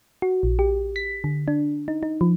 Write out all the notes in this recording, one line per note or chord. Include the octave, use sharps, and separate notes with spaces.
F#4
A#1
G4
B6
D3
D4
D#4
D#4
F3